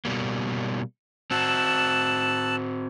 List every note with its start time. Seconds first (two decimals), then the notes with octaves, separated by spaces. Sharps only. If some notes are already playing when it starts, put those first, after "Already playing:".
0.05 B2 G3 A#3
1.31 C4 F#4 A5 E6 F#6